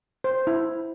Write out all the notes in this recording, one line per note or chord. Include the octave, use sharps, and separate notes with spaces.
C5
E4